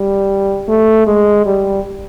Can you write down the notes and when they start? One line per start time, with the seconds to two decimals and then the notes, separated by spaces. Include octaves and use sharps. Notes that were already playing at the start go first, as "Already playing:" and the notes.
Already playing: G3
0.68 A3
1.07 G#3
1.46 G3